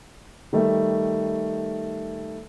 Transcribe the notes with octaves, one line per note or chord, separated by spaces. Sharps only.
D#3 G3 A3